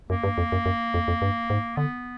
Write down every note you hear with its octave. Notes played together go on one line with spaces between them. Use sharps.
F#2 A#3
G2
F2
F#2
F#2
F2
F2
G2
G#2
D3 B3